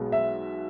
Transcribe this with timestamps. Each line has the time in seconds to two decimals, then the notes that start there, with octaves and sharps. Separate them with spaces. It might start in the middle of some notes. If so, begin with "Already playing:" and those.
Already playing: B1 B2 G#3 B3
0.12 E5